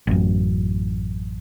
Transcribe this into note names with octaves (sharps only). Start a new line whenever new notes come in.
A1 F#2